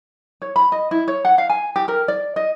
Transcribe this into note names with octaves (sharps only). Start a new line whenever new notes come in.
C#5
B5
D#5
E4
C#5
F#5
F5
G#5
G4
A#4
D5
D#5